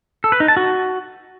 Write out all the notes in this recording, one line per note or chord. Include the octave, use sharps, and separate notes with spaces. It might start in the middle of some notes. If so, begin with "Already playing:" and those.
A4
B4
D#4
A5
F#4